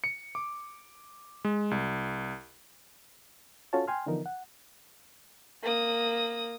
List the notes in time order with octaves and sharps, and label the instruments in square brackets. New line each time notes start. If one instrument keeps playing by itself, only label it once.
[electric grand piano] C#7
D6
G#3
C2
[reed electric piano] C#4 F4 F#4 A4 C#5 A5
G5 G#5 C6 F6
D3 E3 F3 B3 D#4 A#4
F#5
[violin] A#3 D#6